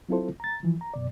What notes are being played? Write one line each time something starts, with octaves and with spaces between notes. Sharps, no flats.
F#3 C4 E4 F4 A4 C5
A#5 A6
E3 F3
A#5
F#2 B2 D5